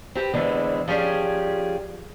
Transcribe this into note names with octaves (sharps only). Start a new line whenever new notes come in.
C4 G4 A4 B4
E2 D3 E3 G#3 C4
F3 C#4 G4 G#4 D5